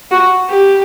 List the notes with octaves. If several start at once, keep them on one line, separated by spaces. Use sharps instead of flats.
F#4
G4